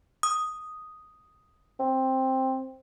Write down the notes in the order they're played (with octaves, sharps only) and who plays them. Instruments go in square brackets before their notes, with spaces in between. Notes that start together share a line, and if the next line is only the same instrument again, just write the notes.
[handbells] D#6
[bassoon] C4